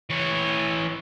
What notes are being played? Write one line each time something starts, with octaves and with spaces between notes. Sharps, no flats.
E3 C#5